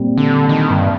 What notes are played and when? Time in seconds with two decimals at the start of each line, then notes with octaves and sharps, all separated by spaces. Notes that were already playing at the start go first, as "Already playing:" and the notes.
Already playing: A#2 G3 C4
0.17 D3
0.49 D#3
0.71 G2